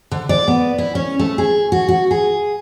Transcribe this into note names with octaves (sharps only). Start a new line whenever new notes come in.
D3
D5
B3
E4
C#4
A3
G#4
F#4
F#4
G#4